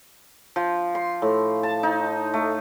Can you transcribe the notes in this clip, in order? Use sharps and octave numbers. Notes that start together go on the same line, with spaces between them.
F3
C6
A2
A5
D#4
A3